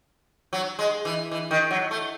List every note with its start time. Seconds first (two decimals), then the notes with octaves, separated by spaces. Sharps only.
0.53 F#3
0.79 G#3
1.05 E3
1.31 E3
1.51 D#3
1.71 F#3
1.91 A3